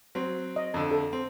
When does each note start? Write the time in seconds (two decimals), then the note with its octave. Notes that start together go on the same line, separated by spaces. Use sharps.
0.15 F#3 C4
0.56 D#5
0.74 F2 D3
0.91 A4
1.13 C4